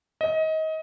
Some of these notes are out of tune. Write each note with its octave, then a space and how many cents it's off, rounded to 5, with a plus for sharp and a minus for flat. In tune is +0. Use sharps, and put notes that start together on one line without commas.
D#5 +25